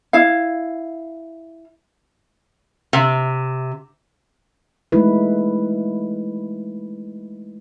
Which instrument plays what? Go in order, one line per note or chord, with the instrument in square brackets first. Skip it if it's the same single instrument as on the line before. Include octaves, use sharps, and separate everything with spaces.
[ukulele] E4 F5
[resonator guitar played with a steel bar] C3
[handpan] E3 G#3 A3 D#4 E4 B4